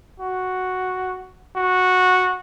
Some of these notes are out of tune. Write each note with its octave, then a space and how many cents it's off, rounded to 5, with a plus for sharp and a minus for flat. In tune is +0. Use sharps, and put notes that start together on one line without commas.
F#4 +0
F#4 -10